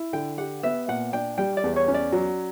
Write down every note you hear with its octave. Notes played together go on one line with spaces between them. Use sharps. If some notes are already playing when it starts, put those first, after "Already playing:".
Already playing: E4
D3 G5
G4 F#5
B3 E5
A#2 F#5
D4 G5
G3 G5
D5
E2
C#5
C#4
D5
F#3